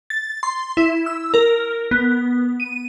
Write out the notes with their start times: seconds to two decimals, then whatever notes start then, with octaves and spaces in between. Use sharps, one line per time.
0.10 A6
0.43 C6
0.77 E4
1.06 E6
1.34 A#4
1.91 B3
2.60 D#7